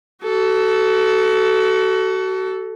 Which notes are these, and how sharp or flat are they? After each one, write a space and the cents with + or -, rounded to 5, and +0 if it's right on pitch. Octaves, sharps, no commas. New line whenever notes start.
F#4 +30 A4 +0